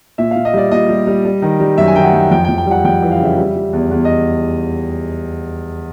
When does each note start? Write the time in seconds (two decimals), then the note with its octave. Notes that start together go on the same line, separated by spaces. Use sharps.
0.18 A#2 E5
0.31 A#2 F5
0.45 D#5
0.54 G3 D5
0.71 A#2 D#5
0.89 G3
1.07 G3
1.25 G3
1.42 D#3
1.60 G3
1.78 F#2 E5
1.88 G#5
1.96 D#3 G5
2.05 F#5
2.13 F#2
2.31 F2 G5
2.44 F2 G5
2.58 G5
2.66 G3 F#5
2.84 F2 G5
3.02 E3
3.11 F5
3.20 C#3 E5
3.38 G3
3.56 G3
3.73 E2
3.91 E2
4.05 D#5